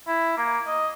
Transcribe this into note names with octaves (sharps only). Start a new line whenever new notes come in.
E4
A#3
D#5